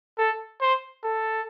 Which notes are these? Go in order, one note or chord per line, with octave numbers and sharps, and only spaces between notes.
A4
C5
A4